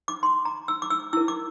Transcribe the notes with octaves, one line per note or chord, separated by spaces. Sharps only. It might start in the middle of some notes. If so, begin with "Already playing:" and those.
D6
C6
A#5
E6
D6
E6
E4 A#4 E6
D6